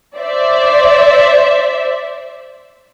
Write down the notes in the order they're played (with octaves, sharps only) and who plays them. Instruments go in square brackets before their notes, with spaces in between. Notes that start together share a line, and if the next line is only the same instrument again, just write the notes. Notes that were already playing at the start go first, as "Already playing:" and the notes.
[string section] C5 D5 E5